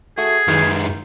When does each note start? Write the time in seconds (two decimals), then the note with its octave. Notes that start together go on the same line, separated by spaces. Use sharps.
0.18 A3 F#4 G#4
0.48 F#2 D#3 E3 G#3